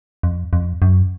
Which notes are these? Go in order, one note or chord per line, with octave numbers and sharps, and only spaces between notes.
F2
F2
F#2